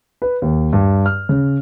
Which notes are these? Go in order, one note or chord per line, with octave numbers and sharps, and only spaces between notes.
B4
D#2
G2
F6
C#3